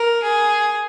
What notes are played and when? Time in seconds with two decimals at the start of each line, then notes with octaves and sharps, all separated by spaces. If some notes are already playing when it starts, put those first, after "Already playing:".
Already playing: A#4
0.22 G#4